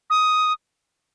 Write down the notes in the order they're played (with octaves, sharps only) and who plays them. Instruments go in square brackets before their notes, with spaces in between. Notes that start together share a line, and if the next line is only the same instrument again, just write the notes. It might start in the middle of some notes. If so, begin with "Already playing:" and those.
[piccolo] D#6